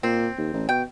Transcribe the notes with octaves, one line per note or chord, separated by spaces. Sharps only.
A#2 C4
D#2
A1
B2 G5